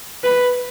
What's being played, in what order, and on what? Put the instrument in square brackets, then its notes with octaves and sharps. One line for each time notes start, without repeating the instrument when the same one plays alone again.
[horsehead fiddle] B4